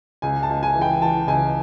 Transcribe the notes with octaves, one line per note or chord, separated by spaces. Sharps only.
C#2 G#5
A5
C#2
G#5
E3
G5
E3 A5
C#2 G#5